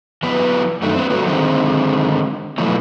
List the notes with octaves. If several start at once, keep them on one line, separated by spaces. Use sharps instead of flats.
E3 F#3 G3 B3 B4
F#2 D#3 A3 D4
C4 B4
F#3 G3 A3 F#4
D3 D#3 G#3 C4 C5
B2 E3 F#3 A3